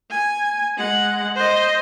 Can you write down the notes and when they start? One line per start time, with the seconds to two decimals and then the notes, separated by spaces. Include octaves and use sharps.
0.11 G#5
0.77 G#3 F#5
1.35 C5 D#5